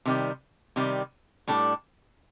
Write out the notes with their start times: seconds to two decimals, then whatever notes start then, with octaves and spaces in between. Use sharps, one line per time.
0.05 C3 D#3 G3
0.76 C3 D#3 G3
1.47 A2 G3 D4 A4